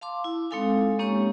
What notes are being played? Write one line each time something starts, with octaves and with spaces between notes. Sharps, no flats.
F5 A5 C6 D6
E4
G#3 C4 D#4 A4 F5 G#5
G#3 A#3 C#4 G4 C#5 C#6